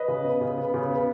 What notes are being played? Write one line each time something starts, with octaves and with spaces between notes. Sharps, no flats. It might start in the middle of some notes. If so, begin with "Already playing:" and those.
Already playing: B4 D#5
C#3
B3
C#3
B3
C#3
B3